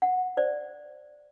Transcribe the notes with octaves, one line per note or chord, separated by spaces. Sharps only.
F#5
C5 D5